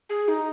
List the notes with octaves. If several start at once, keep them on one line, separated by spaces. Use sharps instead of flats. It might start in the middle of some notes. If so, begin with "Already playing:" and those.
G#4
D#4